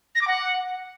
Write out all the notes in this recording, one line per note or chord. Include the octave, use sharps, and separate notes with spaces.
A#6
D6
F#5